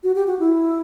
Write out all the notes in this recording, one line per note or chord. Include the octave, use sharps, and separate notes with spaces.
F#4
G4
F#4
E4